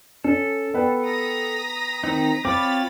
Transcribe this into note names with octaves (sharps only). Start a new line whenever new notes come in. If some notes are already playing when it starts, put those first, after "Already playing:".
C#4 A4
B3 B4 G5
A#5 D#6 B6
D#3 C4 D#4
C4 F4 C#5 B5 D6 A6